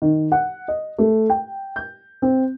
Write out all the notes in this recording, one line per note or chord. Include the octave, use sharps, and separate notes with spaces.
D#3
F#5
D#5
A3
G5
G6
C4